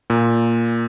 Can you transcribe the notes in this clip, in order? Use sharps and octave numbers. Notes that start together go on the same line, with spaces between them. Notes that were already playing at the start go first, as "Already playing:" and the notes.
A#2